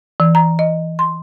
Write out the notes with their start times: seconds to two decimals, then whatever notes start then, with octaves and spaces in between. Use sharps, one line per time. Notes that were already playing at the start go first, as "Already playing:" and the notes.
0.20 E3
0.35 A#5
0.59 D#5
0.99 C6